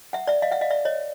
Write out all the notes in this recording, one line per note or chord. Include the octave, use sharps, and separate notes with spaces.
E5 F#5
D5 E5
D#5 F5
E5 F#5
D#5 F5
D5 E5
C#5 D#5